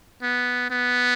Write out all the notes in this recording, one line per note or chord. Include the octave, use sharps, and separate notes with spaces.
B3
B3